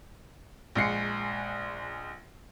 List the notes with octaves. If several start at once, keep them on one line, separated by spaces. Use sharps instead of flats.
A#1 G#3 C7 C#7